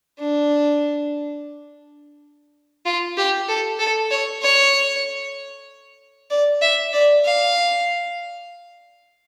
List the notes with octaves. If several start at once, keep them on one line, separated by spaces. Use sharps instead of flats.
D4
F4
G4
A4
A4
C#5
C#5
D5
E5
D5
F5